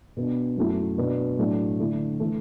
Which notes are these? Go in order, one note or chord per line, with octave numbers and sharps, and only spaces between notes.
B2 B3 D4
F#2 F#3 A3 E4
B2 B3 D4
A2 F#3 A3 D4
D3 A3 E4
E3 A3